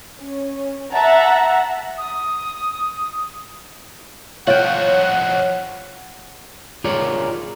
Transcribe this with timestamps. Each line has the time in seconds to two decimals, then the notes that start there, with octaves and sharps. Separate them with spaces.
0.19 C#4
0.90 E5 F#5 A5 A#5
1.98 D#6
4.47 F2 F4 F#4 C#5 F#5 G5
6.84 F4 G#4 A#4 C#5 D5